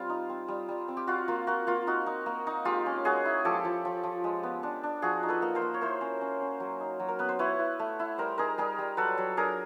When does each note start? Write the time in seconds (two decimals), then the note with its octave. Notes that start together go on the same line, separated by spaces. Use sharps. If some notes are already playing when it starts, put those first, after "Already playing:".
Already playing: G3 C4 F4
0.09 D#4
0.30 C4
0.48 G3
0.68 G3
0.88 C4
0.97 G4
1.07 F4 F#4
1.28 A#3 F4
1.47 A#3 F#4
1.67 A#3 F4
1.87 D#4 F#4
2.06 D#4
2.26 A#3
2.47 D#4
2.65 G#3 F4 G4
2.86 C#4
3.05 G#3 F#4 G#4
3.25 E4
3.44 F3 G4 A4
3.65 F3
3.85 F3
4.03 F3
4.24 G#3
4.43 B3
4.63 D4
4.83 D4
5.02 F3 F#4 G#4
5.23 D#4
5.28 A4 B4
5.42 A#3
5.55 A#4 C5
5.61 A#3
5.74 C#5
5.81 E4 A#4 C5
6.01 C#4
6.21 C#4
6.41 C#4
6.60 F#3
6.80 D#4
7.00 F#3
7.08 A#4
7.19 B3 B4
7.29 C5
7.39 E4 B4 C#5
7.59 E4
7.79 A3
7.99 E4
8.18 G3 A#4 C5
8.38 D#4 G#4 A#4
8.58 G3 G#4 A#4
8.78 G3
8.97 F#3 A4 B4
9.18 F#3
9.37 D4 G#4 A#4